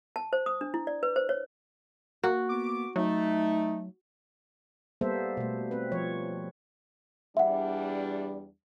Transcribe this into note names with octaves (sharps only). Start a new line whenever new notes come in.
A5
C5
D#6
D4
E4
D5
B4
C5
C#5
A#3 F#4
B3 D6
F#3 A3 D#4
G3 A#3 B3 A4 C5 E5
B2 A3
C4 B4
F3 C#5
E2 G3 D4 E5 F#5